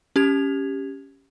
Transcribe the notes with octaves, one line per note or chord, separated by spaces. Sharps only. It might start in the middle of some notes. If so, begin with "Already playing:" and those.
C#4 G4 G#6 F7